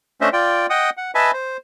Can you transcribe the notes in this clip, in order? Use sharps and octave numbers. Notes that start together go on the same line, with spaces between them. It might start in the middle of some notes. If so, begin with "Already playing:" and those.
A3 C#4 D4 C5 D#5 E5
F4 D5 G5
D#5 F#5 G5 D#6
F#5
B4 D#5 E5 G#5 A5 B5
C5